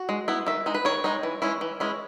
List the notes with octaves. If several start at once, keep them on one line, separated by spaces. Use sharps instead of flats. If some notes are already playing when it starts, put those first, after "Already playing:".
Already playing: F#4
G#3
B3 E4
D#3 E5
G#3 D#4
B4
D#3 C#5
G#3 D#4
E3
G#3 C#4 E4
E3
G#3 C#4 E4